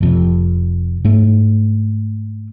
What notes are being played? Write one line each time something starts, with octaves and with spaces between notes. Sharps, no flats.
F1 F2 C3
G#2 A3